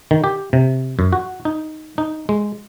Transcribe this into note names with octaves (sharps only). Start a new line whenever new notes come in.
D#3
G4
C3
F#2
F#4
D#4
D#4
G#3